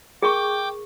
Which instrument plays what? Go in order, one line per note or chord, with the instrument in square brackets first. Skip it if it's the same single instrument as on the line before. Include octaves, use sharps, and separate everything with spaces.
[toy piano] G#4 A#4 C#6 [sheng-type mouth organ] G5 D6